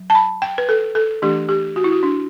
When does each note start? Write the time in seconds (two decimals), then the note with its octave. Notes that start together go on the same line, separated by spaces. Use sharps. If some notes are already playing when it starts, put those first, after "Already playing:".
Already playing: F#3
0.10 A5
0.15 B5
0.42 G5
0.58 B4
0.69 A4
0.95 A4
1.22 E3 A3 D4 G4
1.49 G4
1.76 F#4
1.84 E4
1.92 F#4
2.03 D4